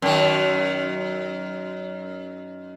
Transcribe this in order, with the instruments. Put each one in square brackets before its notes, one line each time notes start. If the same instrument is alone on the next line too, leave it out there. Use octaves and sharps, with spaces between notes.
[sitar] F#2 D#3